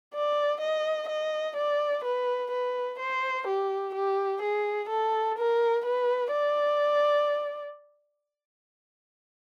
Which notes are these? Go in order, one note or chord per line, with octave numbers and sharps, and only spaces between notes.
D5
D#5
D#5
D5
B4
B4
C5
G4
G4
G#4
A4
A#4
B4
D5